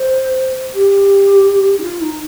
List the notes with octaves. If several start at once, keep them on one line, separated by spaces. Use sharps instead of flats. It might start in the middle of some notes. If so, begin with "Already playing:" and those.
Already playing: C5
G4
D#4
F4
D#4